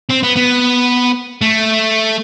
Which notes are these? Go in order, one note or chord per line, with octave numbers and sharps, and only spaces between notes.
C4
B3
B3
A3